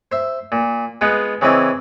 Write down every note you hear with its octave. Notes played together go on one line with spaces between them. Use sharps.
C5 E5
A#2
G#3 B3 F4 F#5
C#3 E3 C4 D5 D#5